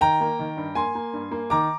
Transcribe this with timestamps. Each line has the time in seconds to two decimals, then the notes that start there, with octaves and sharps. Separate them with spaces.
0.01 D#3 G5 A#5
0.21 A#3
0.39 D#3
0.57 G2
0.75 A#3 G#5 C6
0.95 A#3
1.13 G2
1.31 A#3
1.50 D#3 A#5 D6